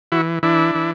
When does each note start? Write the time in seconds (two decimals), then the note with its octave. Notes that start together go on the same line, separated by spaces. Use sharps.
0.12 E3 E4 F#4
0.43 E3 D4 E4
0.75 E3